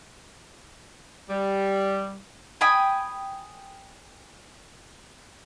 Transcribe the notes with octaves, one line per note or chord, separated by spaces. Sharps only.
G3
G5 G#5 B5 D#6